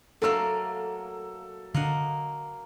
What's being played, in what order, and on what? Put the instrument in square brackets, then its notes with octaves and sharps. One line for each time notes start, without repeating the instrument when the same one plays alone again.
[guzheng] F#3 A3 A#3 [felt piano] A4 E6
[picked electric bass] D3 D4 [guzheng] A#3 D#5 F#5